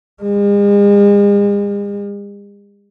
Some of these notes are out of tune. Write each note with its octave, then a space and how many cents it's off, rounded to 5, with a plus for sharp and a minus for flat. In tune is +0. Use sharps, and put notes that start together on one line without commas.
G#3 -45